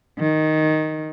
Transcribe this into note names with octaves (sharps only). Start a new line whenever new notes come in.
D#3